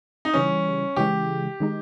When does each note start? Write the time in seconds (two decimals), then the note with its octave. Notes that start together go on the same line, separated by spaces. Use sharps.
0.25 D#4
0.34 C#3 E3 G3 C#4
0.96 C#3 E3 G#3 G4
1.60 D#3 G#3 D#4